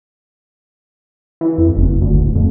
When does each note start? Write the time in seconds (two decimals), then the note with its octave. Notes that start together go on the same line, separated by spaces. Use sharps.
1.41 E3
1.58 F2
1.76 F#1
2.01 D2
2.23 D1
2.35 F2